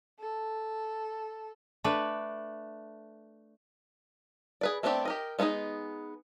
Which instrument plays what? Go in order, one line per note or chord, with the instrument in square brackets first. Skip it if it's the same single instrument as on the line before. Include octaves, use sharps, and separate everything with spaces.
[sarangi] A4
[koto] A3 D4 B4
[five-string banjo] G#4 B4 D5
A3 B3 C4 D4 G4
G4 A#4 D#5
G#3 B3 C#4 D#4 G#4